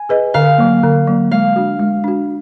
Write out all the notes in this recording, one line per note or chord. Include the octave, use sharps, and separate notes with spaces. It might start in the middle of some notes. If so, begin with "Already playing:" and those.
Already playing: G#5
G#4 B4 D#5
D3 F5
F#3 A#3
D3
F#3 A#3
G#3 F5
D4 F#4
G#3
D4 F#4